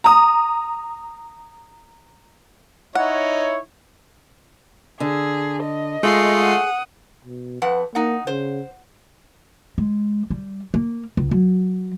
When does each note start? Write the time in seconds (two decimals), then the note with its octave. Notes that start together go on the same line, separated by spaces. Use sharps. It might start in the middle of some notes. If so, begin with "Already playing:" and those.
0.04 A#5 D#6
2.95 D#4 E4 C#5 F#5
5.00 D3 G#4
5.62 D#5
6.03 G#3 A3 F4 G#4 C7
6.39 F#5 D#6
7.25 B2
7.62 F2 B4 F#5
7.95 A#3 D#4 F#5
8.27 C#3 C5
9.78 G#3
10.30 G3
10.74 A#3
11.17 C#2
11.31 F#3